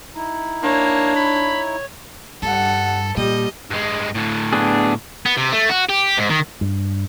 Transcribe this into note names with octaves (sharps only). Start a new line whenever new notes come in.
D#4 E4
A#3 D4 C#5
B5
G2 G3 A4 F#5
A#2 G3 G4 D#5
G2 G#3
A2 D3
B3 D4 G#4
B3
C3
A3
F#4
G4
G#2
D#3
G2